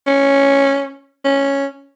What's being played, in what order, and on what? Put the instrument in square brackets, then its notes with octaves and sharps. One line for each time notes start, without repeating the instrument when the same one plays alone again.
[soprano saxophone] C#4
C#4